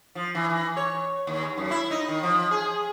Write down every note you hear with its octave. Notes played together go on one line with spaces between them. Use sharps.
F3
E3
E3
C#5
D#2
F#2
E4
D#4
D#3
F3
G#4